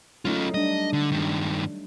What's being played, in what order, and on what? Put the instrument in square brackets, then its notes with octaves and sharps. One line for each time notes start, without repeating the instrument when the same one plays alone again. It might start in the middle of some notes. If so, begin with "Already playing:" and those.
[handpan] F#3 A3 D#4 [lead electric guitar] C#4 F4
[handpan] G3 D4 [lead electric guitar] D#5
[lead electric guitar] D3
G2 D#3